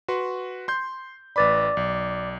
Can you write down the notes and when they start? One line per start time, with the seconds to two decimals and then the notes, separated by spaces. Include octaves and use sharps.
0.08 F#4 B4 C6
0.68 C6 G6
1.36 A1 B4 D5 B5 D6 A6
1.77 B1